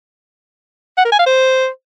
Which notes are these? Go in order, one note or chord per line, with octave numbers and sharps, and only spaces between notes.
F#5
A#4
G#5
F5
C5